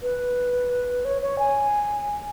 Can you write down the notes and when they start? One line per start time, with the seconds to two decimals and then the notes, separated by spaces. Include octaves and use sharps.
0.02 B4
1.05 C#5
1.22 C#5
1.39 G#5